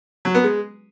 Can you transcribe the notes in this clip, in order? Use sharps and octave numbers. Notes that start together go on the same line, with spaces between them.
F#3
B3
G#3